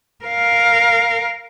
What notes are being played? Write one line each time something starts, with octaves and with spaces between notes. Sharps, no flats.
A#4 F5